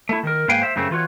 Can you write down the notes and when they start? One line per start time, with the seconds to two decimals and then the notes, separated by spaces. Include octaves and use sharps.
0.09 A3 E4
0.23 D#3 A#4
0.48 G#2 A#3 B4 F5 G5 G#5
0.62 C5 E5
0.76 F#2 C#3 A3 C4
0.91 E3 F4 F#4 C#5